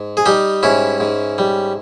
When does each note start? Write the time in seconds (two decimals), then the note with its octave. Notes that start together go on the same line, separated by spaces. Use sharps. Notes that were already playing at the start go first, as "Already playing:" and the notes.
Already playing: G#2
0.17 G#4
0.26 G3 D#4 G4
0.63 G#2 C#4 E4
1.00 G#2
1.38 G3